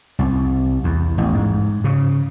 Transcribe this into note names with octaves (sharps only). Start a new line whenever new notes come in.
C2
E2
A1
G#2
C#3